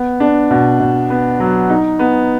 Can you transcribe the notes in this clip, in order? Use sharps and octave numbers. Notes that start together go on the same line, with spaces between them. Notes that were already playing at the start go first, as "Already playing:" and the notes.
Already playing: B3
D4
B2
B2
B3
F#3
D#4
B3